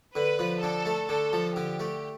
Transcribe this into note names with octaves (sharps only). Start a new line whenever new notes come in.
D3 B4
F3
D3 A4
A3
D3 A4
F3
D3 G4
A3